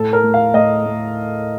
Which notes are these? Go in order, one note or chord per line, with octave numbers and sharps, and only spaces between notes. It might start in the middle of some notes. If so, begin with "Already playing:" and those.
Already playing: A2 A4
A#4
A3
F5
A2 D#5
A3